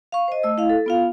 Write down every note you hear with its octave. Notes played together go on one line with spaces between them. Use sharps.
F5 C#6
C5 D#5
A3 D#5 E6
E4 F5
A4
B3 F4 F5